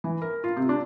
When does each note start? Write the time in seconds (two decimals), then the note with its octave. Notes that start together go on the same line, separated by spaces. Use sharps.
0.04 E3
0.22 A#4
0.44 F4
0.57 C3
0.69 D4